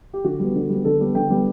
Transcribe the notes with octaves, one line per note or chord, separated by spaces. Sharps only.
G4
D3 F#4
G3 B3
D3
G3 B3
D3 A4
G3 B3
D3 G5
G3 B3